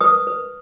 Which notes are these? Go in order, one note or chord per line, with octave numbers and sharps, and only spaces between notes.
B4 D#6
B4